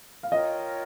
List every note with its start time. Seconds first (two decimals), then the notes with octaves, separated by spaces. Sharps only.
0.23 F5
0.31 F4 A#4 C#5 D#5 G5